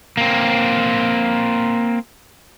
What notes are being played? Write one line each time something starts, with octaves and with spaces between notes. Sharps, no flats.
A#3 C4